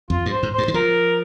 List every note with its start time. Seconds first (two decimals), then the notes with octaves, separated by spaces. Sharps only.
0.10 F2 F4
0.26 G2
0.31 C5
0.43 G#2
0.54 G2 C5
0.68 D#3
0.74 F3 A#4